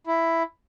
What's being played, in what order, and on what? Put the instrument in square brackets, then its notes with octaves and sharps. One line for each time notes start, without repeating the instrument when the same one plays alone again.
[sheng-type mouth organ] E4